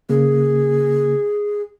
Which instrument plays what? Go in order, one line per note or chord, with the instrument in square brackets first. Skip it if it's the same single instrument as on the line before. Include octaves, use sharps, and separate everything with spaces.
[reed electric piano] C#3 A#3 [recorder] G#4